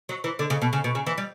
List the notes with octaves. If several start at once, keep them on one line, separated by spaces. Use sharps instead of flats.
F#3
E3
D3
C#3
B2
C#3
B2
C#3
E3
G3